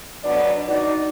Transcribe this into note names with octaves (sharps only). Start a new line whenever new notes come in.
B2 F#3 B3 D4 D5
D#4 F#4 D5